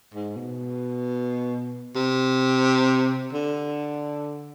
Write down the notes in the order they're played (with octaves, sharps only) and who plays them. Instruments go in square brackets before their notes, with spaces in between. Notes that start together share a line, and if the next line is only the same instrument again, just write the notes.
[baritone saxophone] G#2
B2
C3
D3